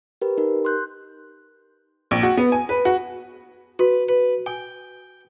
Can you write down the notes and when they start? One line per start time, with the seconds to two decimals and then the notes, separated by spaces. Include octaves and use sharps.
0.22 G4 A#4 B4
0.38 D#4 G4 A#4
0.65 C6 F#6 G6
2.11 A#1
2.23 F#4
2.37 B3
2.52 G#5
2.69 B4
2.85 F#4
3.79 F#4 B4
4.09 B4
4.46 G5 G#5